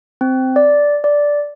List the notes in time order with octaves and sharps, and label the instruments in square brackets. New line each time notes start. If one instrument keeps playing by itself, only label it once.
[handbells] C4
D5
D5